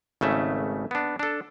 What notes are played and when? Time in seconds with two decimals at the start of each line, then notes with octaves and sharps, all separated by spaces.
0.21 G#1 C#3 A3 E5
0.91 B3 D4
1.19 D4 A4